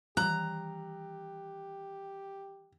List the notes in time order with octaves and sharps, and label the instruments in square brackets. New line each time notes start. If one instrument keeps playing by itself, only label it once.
[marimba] D#3 E3 G3 [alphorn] G4 [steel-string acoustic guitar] A#5 [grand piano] F#6